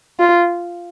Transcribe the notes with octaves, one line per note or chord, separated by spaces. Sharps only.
F4